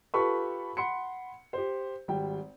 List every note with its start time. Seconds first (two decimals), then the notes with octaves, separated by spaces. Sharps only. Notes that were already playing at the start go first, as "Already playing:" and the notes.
0.14 F4 G4 A4 B4 B5 C#6
0.77 F#5 B5 C6 C#7
1.53 G4 C5
2.08 G#1 G3 G5